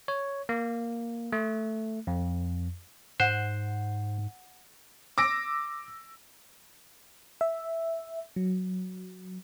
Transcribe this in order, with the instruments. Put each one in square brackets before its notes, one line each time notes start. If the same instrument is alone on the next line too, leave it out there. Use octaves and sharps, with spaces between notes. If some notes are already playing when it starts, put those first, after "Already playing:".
[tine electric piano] C#5
A#3
A3
F2
[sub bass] G#2 [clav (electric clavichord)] C5 [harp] F#5
[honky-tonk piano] D6 E6 A#6 D7
[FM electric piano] E5
F#3